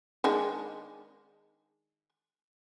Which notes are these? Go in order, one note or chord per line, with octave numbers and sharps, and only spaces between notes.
D#3 G#3 D4